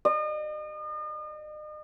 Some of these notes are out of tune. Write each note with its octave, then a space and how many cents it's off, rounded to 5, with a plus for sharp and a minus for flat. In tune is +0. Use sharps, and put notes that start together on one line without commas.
D#5 -40